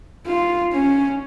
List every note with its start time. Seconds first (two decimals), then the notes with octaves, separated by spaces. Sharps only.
0.27 F4
0.73 C#4